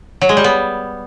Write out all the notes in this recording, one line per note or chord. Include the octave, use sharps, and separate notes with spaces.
F#3
G#3
G3
B3